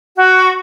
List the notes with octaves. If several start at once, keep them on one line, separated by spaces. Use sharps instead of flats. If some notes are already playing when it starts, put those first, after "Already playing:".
F#4